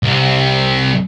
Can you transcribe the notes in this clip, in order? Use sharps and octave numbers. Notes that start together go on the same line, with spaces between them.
C2 C3